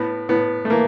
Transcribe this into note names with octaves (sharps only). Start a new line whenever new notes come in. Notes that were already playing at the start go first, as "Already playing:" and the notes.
Already playing: A2 B3
A2 B3
A3
E3 A#3